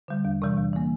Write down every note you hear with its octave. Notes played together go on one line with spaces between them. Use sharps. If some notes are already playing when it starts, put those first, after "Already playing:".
D3 G3
E2
C3 E3 G3
E2
E3 A#3